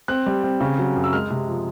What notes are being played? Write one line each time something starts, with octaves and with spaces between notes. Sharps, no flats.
C4 F#6
G3
C4
C#3
F#3
F#2
E6
G#3 F6
C3
F3